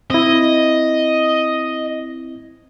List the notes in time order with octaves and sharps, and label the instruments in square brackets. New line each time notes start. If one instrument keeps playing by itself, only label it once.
[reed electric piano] C4 E4 [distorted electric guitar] D#5